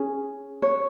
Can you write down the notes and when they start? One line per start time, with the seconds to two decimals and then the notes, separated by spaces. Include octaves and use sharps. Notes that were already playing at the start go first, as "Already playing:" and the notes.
Already playing: C#4 G#4
0.62 C#5